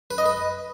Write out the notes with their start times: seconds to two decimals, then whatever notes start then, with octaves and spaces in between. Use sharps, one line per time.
0.11 B4
0.18 D#5
0.26 B4